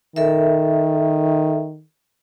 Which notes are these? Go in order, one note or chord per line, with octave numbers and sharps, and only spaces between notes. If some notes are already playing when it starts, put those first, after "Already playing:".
D#3 A4 A#4 E5